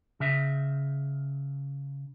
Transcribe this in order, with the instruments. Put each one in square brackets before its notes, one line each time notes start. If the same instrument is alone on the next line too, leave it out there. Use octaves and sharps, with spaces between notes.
[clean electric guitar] C#3 E5